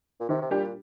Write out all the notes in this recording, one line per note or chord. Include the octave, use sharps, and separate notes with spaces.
A#2
C3 D#3
C3
A#2 G3 D4 G4